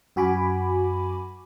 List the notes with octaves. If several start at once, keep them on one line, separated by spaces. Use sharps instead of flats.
F#2 F#4 G#5 B5 D6